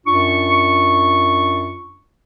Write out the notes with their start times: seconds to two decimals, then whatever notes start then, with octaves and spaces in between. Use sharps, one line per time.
0.06 F#2 D4 F4 C#6